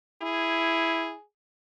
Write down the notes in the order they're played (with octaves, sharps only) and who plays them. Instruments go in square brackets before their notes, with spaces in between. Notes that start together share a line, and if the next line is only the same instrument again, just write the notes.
[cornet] E4 [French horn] G#4